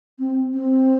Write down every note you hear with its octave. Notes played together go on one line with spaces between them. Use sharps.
C4
C4